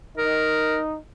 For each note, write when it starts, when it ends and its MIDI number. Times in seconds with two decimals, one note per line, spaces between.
0.18 0.96 63
0.18 0.78 70